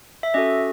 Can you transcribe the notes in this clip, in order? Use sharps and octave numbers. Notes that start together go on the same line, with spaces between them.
E5
C#4 F#4 A4 D#5